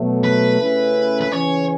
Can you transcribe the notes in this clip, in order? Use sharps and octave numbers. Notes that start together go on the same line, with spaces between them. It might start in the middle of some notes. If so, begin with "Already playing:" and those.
Already playing: B2 F#3 A3
B4
C#3 A3 C#4 E4
B4
C#3 E3 C#4 C#5